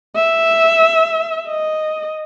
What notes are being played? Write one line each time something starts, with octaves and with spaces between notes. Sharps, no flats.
E5
D#5